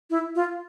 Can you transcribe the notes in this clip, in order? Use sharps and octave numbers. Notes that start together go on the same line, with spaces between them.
E4
F4